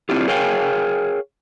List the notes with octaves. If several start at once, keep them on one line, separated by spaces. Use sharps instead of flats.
C4 D4 E4 F4 G4
G#4 A#4 C#5 F5 G5 G#5